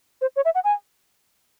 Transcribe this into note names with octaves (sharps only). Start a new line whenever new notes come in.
C5
C#5
E5
F#5
G#5